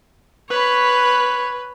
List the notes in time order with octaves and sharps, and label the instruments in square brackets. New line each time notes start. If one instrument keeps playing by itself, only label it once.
[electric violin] B4 [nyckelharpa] C#5 B5